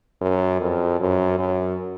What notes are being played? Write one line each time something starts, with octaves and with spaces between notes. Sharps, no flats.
F#2
F2
F#2
F#2